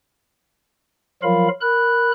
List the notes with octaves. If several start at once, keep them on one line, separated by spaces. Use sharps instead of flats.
F3 F#3 F4 A#4 F5 B5
A#4 B5 F#6